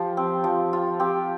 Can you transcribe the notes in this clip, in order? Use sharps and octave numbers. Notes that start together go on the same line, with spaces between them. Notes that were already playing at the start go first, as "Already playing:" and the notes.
Already playing: F3 F4 G4
C4
F3
F4
C4 G4